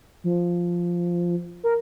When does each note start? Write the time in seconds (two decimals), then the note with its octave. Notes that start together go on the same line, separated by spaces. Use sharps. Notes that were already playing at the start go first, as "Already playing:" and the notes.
0.24 F3
1.64 A#4